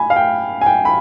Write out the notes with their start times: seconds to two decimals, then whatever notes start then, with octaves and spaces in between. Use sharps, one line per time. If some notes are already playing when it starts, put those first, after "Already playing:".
Already playing: G#5 B5
0.10 F5
0.16 G5
0.61 G#5
0.66 G5
0.85 B5